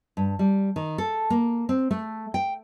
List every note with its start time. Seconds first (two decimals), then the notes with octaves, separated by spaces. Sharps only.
0.17 G2
0.39 G3
0.76 D#3
0.98 A4
1.30 A#3
1.69 C4
1.91 A3
2.34 G5